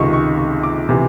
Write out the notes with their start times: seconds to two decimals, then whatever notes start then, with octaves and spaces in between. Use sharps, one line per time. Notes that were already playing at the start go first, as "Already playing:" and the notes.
Already playing: C#2 C3 D#3 C#6
0.13 C#6
0.38 C#6
0.63 D6
0.89 C3 E3